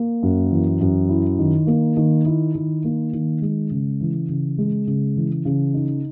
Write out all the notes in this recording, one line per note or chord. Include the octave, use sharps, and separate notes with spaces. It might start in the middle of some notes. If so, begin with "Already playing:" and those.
Already playing: A#3
F#2
E3
F#2
E4
D#3
A#3
D#3
E4
D#3
A#3
D#3
G#3
C#3
E3
C#3
G#3
C#3
E3
C#3
D#4